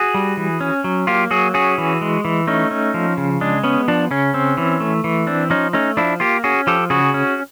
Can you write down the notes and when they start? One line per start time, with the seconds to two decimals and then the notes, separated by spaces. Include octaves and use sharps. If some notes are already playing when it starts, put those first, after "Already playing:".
Already playing: F#4 G#4
0.14 G3
0.37 E3
0.61 C#4
0.84 F#3
1.07 A#3 F4 G4
1.31 F#3 F#4 G#4
1.54 C#4 F#4 G#4
1.78 E3
2.01 G#3
2.25 E3
2.47 A3 C#4 D#4
2.71 C#4
2.94 F3
3.18 C#3
3.41 G#3 D4
3.64 B3 C#4
3.88 F3 D4
4.11 C#3 C#4
4.34 C4
4.57 E3
4.80 A3
5.04 E3
5.27 C4 D4
5.50 F3 C#4 D#4
5.73 A3 C#4 D#4
5.97 F3 D4 E4
6.20 A#3 F4 G4
6.44 C#4 F#4 G#4
6.67 F3 G4 A4
6.90 C#3 F#4 G#4
7.14 C#4